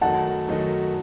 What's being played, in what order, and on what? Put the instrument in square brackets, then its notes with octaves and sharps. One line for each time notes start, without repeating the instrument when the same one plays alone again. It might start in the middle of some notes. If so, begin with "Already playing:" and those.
[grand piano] F#2 D#3 F#3 A3 D#4 [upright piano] F#5 A5
[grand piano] F#2 D#3 F#3 A3 D#4